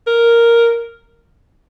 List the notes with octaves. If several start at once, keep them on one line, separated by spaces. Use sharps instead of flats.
A#4